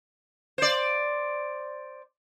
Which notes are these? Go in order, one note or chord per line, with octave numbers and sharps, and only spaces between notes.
C5 D5